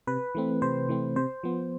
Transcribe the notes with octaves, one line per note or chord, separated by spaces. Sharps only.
C3 B4
E3 A3 C4
C3 C5
E3 A3 C4
C3 C5
F3 B3